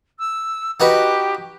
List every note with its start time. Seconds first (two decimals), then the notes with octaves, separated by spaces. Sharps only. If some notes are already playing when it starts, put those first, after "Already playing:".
0.18 E6
0.80 D#4 F#4 G4 B4